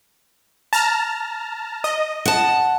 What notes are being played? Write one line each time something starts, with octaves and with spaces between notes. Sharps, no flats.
A5 A#5 F6
D#5
F#5 A5